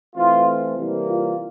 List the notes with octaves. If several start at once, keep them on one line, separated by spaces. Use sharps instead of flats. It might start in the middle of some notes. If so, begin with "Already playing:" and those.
E3 A3 C4 F4
C3 E3 G3 A#3
F4